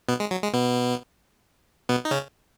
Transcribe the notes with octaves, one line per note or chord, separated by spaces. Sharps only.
B2 B3
G#3
F#3
G#3
B2 B3
B2 B3
D#4
C#3 C#4